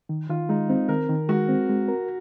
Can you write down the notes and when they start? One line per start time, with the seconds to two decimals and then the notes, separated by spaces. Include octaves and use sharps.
0.09 D#3
0.30 D#3 F4
0.49 G#3 D#4
0.69 C4 D#4
0.88 D#3 A#4
1.09 D#3
1.28 G#3 F#4
1.48 C4
1.69 G#3
1.88 A#4